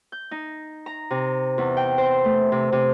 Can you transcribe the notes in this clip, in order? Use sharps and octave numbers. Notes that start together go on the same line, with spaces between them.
G6
D#4
A#5
C3
E2
G5
C5
A3
C3
C3